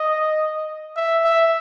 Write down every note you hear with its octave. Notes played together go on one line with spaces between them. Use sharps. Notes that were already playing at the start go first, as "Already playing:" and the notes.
Already playing: D#5
E5
E5